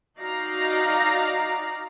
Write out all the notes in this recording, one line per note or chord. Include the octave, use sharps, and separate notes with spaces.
D#4 F#4 D5 F5 A#5